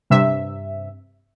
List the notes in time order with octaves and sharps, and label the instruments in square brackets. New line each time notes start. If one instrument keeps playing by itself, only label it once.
[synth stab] G2 C3 E5